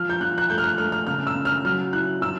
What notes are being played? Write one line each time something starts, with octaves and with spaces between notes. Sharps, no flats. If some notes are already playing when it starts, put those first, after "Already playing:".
Already playing: F3 F6
G6
F3 F#6
F#6
A3 G6
F6
F#6
A3 F6
F6
C#3 F6
E6
C#3
F6
F#3 F6
E4 F#6
F#3 E6